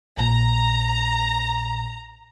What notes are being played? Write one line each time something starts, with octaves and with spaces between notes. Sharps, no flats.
A#1 A#2 A#5